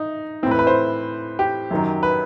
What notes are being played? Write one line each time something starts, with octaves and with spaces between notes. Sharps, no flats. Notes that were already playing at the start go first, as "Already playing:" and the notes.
Already playing: D#4
A2 E3 C4 B4
B4
C5
G4
F#2 D#3 F#3
B4